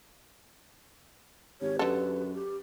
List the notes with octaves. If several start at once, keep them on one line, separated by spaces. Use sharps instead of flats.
G#1 G4 C#5
F#2 D3 A4 B4
G4